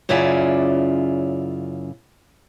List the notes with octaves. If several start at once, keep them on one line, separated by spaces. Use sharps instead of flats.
F#2 C#3 E4 F4 D5 G#5